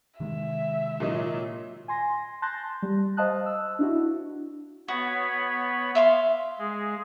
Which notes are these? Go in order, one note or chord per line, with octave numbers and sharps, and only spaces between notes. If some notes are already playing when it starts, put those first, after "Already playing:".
C3 D#3 G#3 E5
A#2 F#3 D#5
G#5 C6 A#6
A5 C6 F#6 G6 A6 A#6
G3
C5 D#5 F5 A5 D#6 F#6
E6
D4 E4 F#4
B3 F#4 C#5 B5
E5 F5 C6
G#3 G#4